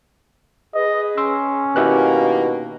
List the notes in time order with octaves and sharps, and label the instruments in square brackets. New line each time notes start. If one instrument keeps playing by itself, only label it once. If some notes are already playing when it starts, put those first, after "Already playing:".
[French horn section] G#4 B4 [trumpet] D#5
[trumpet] C#4 [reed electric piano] C6 E6
[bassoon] B2 [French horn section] D#3 A#3 [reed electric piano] E4 G4 F#6